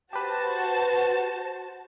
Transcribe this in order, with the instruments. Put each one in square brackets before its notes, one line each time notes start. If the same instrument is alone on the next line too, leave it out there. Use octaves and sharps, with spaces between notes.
[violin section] F#4 C5 A5 [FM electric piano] G4 B4